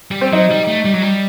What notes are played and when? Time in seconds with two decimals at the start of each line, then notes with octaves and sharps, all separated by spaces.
0.11 G3
0.21 C4
0.33 F#3 D#4
0.51 G3
0.67 A3
0.85 G3
0.94 F#3
1.02 G3